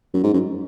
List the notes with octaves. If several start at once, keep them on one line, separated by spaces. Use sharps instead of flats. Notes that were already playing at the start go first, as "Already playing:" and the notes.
F#2
G#2
F#2